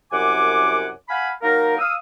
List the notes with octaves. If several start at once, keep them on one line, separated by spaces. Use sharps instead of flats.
C2 F#2 F#5 G#5 D6
F5 F#5 G#5 B5
F#3 A#3 D#4 A#4
F5 D#6 E6